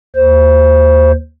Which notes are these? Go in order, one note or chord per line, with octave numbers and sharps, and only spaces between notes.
D#2 C5